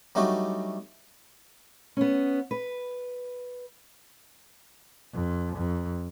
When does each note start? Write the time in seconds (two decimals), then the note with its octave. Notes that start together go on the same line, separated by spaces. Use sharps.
0.15 F#3 G3 A3 D4 D#4 F#4
1.97 B3 C#4
2.51 B4
5.13 F2
5.56 F2